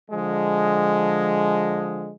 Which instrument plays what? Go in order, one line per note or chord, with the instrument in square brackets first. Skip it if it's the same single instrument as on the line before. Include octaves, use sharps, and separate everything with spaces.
[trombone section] D3 F3 G#3